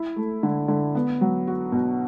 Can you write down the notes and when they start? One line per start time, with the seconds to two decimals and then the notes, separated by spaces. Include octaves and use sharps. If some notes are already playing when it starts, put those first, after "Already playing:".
Already playing: E4
0.16 A3
0.43 D3
0.68 D3
0.95 B3
1.21 F#3
1.47 F#4
1.72 B2